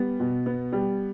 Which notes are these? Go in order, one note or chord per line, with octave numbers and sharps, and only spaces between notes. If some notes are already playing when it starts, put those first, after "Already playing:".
Already playing: G3 B3
B2
B3
G3